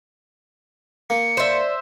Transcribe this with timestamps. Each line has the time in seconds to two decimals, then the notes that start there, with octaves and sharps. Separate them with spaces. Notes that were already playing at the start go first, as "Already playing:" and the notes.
1.10 A#3 C#7
1.37 C5 D5 E5